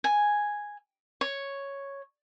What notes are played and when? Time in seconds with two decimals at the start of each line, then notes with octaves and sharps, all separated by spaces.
0.04 G#5
1.21 C#5